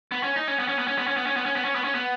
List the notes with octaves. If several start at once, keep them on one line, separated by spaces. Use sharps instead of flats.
B3
C#4
D#4
C#4
B3
C#4
B3
C#4
B3
C#4
B3
C#4
B3
C#4
B3
C#4
B3
C#4
B3